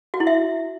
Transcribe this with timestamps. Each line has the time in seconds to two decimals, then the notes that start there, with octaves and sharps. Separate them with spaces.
0.14 F#4
0.20 E4
0.27 E5